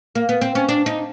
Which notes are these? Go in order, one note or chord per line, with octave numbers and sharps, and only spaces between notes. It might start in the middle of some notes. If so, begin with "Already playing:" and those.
A#3
B3
C4
C#4
D4
D#4